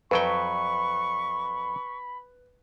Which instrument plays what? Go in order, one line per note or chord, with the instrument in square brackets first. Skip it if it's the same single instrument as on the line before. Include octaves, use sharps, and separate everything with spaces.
[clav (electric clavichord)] F2 F#3 G5 [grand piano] B4 [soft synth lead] B5 [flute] C#6